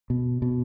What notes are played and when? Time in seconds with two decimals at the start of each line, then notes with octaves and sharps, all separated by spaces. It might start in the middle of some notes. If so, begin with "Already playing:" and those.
0.10 B2
0.42 B2